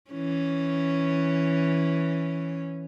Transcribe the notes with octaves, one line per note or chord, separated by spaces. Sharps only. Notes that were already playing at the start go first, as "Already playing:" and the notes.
E3 C#4